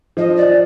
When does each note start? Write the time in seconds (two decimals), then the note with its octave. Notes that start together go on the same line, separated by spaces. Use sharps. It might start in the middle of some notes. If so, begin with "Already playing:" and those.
0.17 F3 D#5
0.36 D5